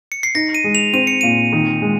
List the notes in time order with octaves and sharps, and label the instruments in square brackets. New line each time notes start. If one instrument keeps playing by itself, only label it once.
[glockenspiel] C#7
C7
[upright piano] D#4 [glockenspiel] A#6
[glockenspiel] D#7
[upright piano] G#3
[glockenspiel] F7
[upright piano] C4 [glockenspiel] D#7
[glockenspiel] C#7
[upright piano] A#2 [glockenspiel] D#7
[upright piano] D#3
G#3